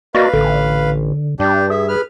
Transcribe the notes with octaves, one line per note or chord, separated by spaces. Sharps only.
A#3 F#4 B4 D5 D#5 F5
A1 D3
G2 D4 G4
G#4 E5
B4 F6